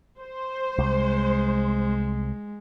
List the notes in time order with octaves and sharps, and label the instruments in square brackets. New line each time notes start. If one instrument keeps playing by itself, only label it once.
[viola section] C5
[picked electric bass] C2 [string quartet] G#3